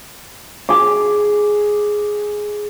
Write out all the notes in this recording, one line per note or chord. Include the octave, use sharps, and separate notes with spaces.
G#4 D6